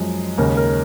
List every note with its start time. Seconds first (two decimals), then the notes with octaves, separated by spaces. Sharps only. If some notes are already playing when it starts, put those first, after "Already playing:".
Already playing: F#2 F3 G#3
0.38 D#2 C#3 G#3 A#4
0.57 A#4